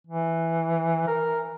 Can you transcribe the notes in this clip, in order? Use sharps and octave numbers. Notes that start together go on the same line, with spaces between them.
E3
A#4